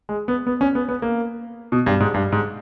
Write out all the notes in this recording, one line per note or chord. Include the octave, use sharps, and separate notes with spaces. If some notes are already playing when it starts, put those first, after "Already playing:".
G#3
B3
B3
C#4
B3
B3
A#3
B2
G2
G#2
G2
G#2